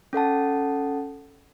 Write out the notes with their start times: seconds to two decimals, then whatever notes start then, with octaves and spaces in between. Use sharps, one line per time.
0.13 C#4 A4 F#5 A5